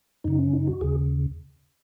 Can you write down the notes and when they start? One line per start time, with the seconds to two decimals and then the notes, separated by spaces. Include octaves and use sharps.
0.24 F#2 C#3 D#4
0.39 C#4
0.53 D#4
0.67 F#4
0.81 D#2 C#3 G#4